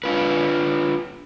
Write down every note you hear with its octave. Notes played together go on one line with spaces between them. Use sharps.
D4 F4 B4